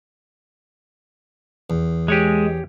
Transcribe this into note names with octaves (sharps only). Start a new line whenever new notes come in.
E2
G#3 G4 C#5 G#5